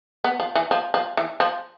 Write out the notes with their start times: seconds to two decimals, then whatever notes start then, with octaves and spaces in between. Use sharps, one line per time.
0.24 B3
0.40 F3
0.55 E3
0.71 F3
0.94 F3
1.17 E3
1.40 F3